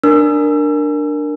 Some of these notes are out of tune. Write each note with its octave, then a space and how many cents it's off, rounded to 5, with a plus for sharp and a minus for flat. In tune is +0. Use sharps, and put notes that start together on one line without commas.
D4 +10 A#4 +0 E6 +30